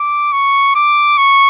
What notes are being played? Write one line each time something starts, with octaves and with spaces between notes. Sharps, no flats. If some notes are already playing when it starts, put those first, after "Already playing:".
Already playing: D6
C#6
D6
C#6